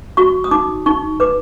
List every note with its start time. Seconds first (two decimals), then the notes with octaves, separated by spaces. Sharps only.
0.17 F#4 C#6
0.44 D#6
0.51 D#4 D6
0.86 D#4 C#6
1.20 B4 D6